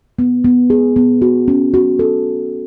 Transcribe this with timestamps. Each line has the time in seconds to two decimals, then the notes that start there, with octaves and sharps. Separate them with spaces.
0.19 B3
0.44 B3
0.70 G#4
0.96 B3
1.22 F#4
1.48 C#4
1.74 F#4
1.99 A4